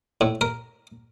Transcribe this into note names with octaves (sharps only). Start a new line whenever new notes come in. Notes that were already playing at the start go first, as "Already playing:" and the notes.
A2
A#4